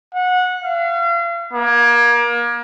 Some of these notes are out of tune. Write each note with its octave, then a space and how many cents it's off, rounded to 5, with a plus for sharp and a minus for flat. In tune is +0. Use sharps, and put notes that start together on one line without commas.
F#5 -20
F5 -40
A#3 +30